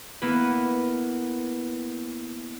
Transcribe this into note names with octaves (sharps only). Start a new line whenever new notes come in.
A#3 B3 E4 B4